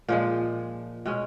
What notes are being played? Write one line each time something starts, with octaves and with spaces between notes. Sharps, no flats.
A#2 F3 G#3
B2 G#3 C#4